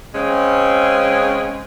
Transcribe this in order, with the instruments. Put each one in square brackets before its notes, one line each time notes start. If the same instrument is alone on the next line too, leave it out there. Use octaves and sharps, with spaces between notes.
[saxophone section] C#3 G#3 C4 C#4